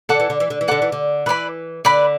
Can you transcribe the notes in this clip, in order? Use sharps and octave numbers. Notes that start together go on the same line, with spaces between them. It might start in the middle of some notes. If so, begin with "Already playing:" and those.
D3 A4 F#5 D6
E3
D3
E3
D3
E3
D3 A4 F#5 D6
E3
D3
E3 B4 D5 B5
D3 B4 D5 B5